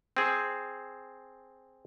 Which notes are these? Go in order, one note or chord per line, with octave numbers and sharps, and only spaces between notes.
C4 G#4